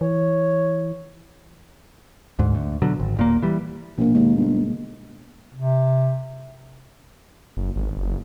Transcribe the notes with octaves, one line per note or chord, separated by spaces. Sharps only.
E3 C#5
D2 G#2
D2
B2 D3 F#3
G#1
D#1 A#2 A#3
E3 G3
A#1 B2 A#3
D#2 G#3
G1
C3
F#1
G#1
F#1